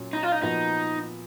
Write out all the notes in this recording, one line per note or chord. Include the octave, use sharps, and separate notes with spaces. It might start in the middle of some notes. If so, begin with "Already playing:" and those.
Already playing: A#2 F#3 C#4
D#4
F4
D#4
A#2 F3 B3 D#4 F#4